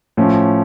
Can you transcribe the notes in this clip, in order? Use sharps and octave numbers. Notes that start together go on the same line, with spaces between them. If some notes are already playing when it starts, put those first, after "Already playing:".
A2 F3 C#4